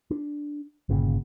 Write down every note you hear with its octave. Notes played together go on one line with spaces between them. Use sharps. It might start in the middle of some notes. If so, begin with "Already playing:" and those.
D4
G1 A#2 C#3